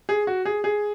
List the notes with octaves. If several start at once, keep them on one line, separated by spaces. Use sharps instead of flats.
G#4
F#4
G#4
G#4